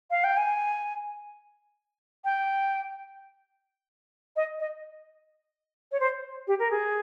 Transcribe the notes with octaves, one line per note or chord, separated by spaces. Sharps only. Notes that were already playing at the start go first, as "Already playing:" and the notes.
F5
G5
G#5
G5
D#5
D#5
C#5
C5
G4
A#4
G#4